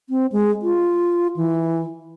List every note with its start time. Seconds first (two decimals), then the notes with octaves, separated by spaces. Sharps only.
0.09 C4
0.32 G#3
0.62 F4
1.36 E3